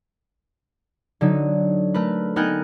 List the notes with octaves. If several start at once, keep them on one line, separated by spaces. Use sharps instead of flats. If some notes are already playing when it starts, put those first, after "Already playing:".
D3 F#3 D#4
A3 A#4 B4
B3 D#4 A#4 G5 G#5 F#6